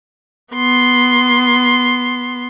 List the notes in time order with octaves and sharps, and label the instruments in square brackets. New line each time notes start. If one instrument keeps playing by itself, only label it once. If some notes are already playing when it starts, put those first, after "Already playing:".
[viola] B3 C6